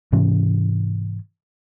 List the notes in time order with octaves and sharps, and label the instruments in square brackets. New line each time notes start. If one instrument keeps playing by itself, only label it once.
[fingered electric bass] G#2 C3 E3 C#4